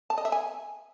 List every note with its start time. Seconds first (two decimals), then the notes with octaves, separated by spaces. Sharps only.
0.10 A5
0.18 D#5
0.25 E5
0.32 G#5